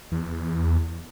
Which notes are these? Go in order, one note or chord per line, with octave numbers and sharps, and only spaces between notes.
E2